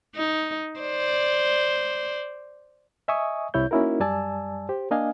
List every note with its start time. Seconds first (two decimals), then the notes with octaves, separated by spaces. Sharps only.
0.15 D#4
0.80 C5 D5
3.08 D#5 E5 G#5 C#6 D#6
3.54 C2 C3 E4 C#5 G6
3.71 A#3 C#4 D#4 E4 F#4 A#4
4.00 F#2 G3 D5 G#5 A5 E6
4.69 G4 C5
4.91 A#3 D4 D#5 F5 G#5